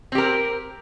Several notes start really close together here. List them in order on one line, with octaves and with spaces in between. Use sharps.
C4 G4 A#4